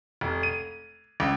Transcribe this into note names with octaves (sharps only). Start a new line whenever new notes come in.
F1
D#7
C#2